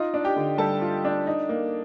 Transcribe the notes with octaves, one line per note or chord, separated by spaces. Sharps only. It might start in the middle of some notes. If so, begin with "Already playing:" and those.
Already playing: D#4 F4 D#5
D4
G4 G5
D3
G3 A4 A5
F4
D4
D#4
A#3